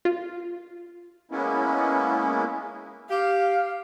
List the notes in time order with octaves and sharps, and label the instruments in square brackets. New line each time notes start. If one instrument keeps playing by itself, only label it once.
[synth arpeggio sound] F4
[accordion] G#3 A#3 B3 C#4 E4
[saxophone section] G4 [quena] F5